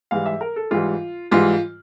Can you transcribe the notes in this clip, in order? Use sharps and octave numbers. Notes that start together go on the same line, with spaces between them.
G#2 E3 G3 F5
E5
A#4
A4
G#2 E3 G3 F4
G#2 E3 G3 F4